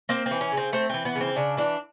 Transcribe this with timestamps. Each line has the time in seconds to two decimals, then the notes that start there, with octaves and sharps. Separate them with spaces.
0.09 A#3 C4
0.26 C4
0.31 E3
0.41 C#4
0.52 C#3
0.57 C4
0.73 A3 C4
0.89 E3 C4
1.05 B3
1.15 C#3
1.21 C4
1.36 C#3 D4
1.57 E3 D4